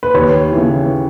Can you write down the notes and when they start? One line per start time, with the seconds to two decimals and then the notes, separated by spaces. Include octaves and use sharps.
0.03 B4
0.14 D#2 C#5
0.52 E3
0.57 C#3